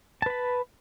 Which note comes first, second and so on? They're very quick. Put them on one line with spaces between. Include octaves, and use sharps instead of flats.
A5 B4 B5